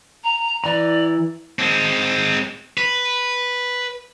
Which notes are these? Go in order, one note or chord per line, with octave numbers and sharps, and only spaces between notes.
A#5
E3 D5 A#5
G#3 C4
B4